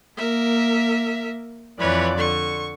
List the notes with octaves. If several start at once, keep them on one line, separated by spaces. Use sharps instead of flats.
A#3 A#4 E5
F2 E3 B4 C#5 D5
D3 C#6